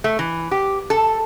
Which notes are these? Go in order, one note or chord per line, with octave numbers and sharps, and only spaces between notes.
A3
E3
G4
A4